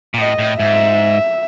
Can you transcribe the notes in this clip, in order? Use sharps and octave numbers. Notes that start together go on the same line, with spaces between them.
A#2
A2 D#5
A2
G#2 E5